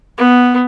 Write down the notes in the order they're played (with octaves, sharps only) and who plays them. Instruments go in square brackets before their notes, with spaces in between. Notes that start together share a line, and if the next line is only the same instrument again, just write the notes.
[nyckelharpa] B3